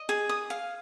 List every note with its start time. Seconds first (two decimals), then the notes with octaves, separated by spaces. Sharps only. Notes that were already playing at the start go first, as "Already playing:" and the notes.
Already playing: D#5
0.09 G#4
0.29 D#6
0.50 F5